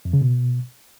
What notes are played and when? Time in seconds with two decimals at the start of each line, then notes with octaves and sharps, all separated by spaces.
0.05 F2
0.13 C#3
0.22 B2